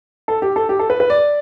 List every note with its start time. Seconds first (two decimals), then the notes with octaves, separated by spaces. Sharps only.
0.28 A4
0.42 G4
0.56 A4
0.69 G4
0.79 A4
0.90 B4
1.00 B4
1.10 D5